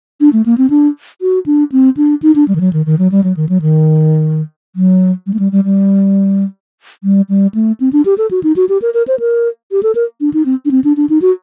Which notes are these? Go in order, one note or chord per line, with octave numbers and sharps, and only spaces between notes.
D4
A3
A#3
C4
D4
F#4
D4
C4
D4
D#4
D4
G3
D#3
F#3
D#3
D#3
F#3
G3
F#3
D#3
F#3
D#3
F#3
G3
A3
G3
G3
G3
G3
G3
A3
C4
D4
G4
A4
F#4
D#4
F#4
G4
A#4
A#4
C5
A#4
G4
A4
A#4
D4
D#4
C4
D4
C4
D4
D4
D#4
F#4